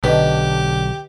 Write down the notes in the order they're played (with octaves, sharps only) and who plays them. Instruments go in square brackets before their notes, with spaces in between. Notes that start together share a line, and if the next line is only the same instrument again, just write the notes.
[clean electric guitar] B1 [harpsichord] D3 [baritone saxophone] G4 [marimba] B4 D#5